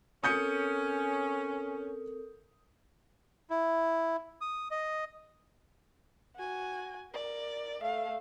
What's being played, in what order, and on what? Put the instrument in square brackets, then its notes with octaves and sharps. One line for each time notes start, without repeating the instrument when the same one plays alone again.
[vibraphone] C4 A4 A#4 [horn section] C#4 [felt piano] D#6 G6 C#7
[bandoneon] E4
D#6
D#5
[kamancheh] F#4 G#5
A#4 D5
A3 F5